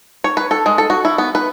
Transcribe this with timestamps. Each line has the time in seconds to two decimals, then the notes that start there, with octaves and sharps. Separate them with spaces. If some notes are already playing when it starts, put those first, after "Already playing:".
0.24 C#5
0.37 B4
0.51 A4
0.66 G#3
0.78 A4
0.90 F#4
1.05 E4
1.18 B3
1.35 B4